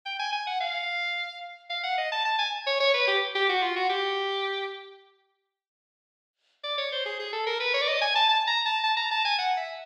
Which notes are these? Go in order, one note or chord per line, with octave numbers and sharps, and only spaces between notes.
G5
G#5
G#5
F#5
F5
F5
F#5
D#5
A5
A5
G#5
C#5
C#5
B4
G4
G4
F#4
F4
F#4
G4
D5
C#5
C5
G#4
G#4
A4
A#4
B4
C#5
D5
D#5
G#5
A5
A5
A#5
A5
A5
A#5
A5
G#5
F#5
E5